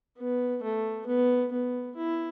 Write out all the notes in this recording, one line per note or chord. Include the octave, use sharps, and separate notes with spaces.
B3
A3
B3
B3
E4